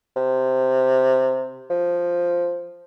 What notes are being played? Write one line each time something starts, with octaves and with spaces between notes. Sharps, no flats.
C3
F3